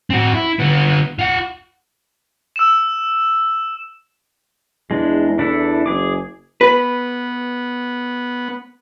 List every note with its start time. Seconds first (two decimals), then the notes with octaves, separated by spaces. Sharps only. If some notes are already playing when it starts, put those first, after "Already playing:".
0.10 C4 F#4
0.34 E4
0.59 D3 B3
1.19 F4 F#5
2.56 E6 E7
4.91 E2 G#3 D4
5.39 D4 E4 A4
5.86 F#1 G#4 D6
6.61 B3 B4